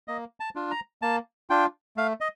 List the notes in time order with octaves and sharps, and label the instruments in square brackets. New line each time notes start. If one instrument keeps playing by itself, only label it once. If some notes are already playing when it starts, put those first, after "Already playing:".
[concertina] A#3 D#5
A5
D4 F4
A#5
A#3 A5
D4 F4 G5
A3 F5
D#5